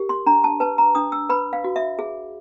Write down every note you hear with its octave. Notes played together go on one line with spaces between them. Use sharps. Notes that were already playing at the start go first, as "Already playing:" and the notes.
Already playing: G4 A#4
C6
D4 A#5
A5
B4 A5
A#5
D4 D#6
E6
B4 B5
F5
F#4
E5
G#4